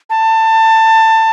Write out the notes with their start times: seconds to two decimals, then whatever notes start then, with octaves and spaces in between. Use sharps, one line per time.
0.10 A5